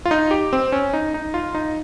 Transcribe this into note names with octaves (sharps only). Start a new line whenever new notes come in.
F4
D#4
G4
C4
C#4
D#4
D#4
F4
D#4